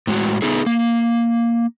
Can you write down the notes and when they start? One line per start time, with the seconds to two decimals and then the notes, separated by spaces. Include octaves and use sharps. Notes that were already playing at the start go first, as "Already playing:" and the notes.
0.07 A2 G#3 F#4
0.42 A3 B3 D#4 G#4
0.66 A#3